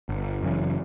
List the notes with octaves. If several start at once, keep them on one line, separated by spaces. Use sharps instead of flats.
G1
F#2 C#3 E3